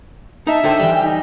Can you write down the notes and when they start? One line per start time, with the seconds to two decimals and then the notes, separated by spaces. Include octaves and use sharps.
0.47 D#4 E5 A5
0.64 D3 A4 C5 G5
0.80 E3 G3
1.03 D#4